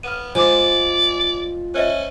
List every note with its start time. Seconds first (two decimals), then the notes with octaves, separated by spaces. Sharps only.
0.03 B3 F6 D#7
0.35 G#3 F4 C5 D5 G#5 D6
1.74 C#4 C5 D#5 E5